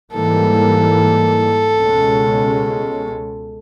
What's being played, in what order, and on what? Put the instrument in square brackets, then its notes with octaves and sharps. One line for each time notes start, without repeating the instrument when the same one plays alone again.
[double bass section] G#2 E3 G3 A#3 [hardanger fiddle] A4
[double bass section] C#2 B2 G#3 C#4